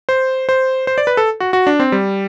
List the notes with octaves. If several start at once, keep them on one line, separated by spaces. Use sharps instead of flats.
C5
C5
C5
D5
B4
A4
F#4
F#4
D4
C4
G3